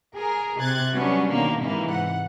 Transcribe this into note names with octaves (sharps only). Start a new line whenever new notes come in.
G#4 A#4
C3 F#6 G#6 A6
F#3 G3 B3 C#4 D4
B2 D3 D#3 A#3
G#2 C3 E3 A#3
F#5